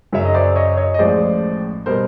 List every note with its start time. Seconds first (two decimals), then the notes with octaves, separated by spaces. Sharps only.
0.13 F#2 C#3 F#3 E5
0.25 D#5
0.34 C5 D5
0.56 C#5 D#5
0.77 C#5 D#5
0.94 D#5
0.99 A1 A2 F3 G#3 C5 D5
1.86 B2 G3 A#4 C5